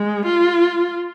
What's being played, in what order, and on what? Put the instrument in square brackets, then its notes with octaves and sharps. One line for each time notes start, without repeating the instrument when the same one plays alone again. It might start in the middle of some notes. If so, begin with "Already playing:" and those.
Already playing: [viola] G#3
F4